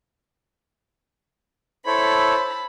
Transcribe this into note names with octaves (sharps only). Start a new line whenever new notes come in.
E4 A4 C5 C#5 A5 B5